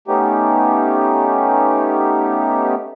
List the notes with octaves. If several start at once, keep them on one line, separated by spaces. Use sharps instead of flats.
A3 B3 C#4 D#4 G4